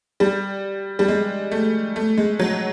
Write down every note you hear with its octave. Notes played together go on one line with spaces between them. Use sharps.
G3
G3
G#3
A3
A3
G#3
F#3